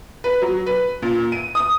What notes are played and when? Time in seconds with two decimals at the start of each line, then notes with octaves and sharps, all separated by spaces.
0.24 B4
0.42 F#3
0.67 B4
1.02 A#2
1.32 D#7
1.55 D#6